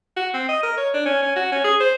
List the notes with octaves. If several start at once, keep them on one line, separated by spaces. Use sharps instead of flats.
F#4
C4
D#5
A#4
C#5
D4
C#4
C#4
F#4
C#4
G#4
C5